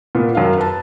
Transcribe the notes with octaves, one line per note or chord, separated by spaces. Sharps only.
A#2 B3
F#2 D#3 F5
B4 A5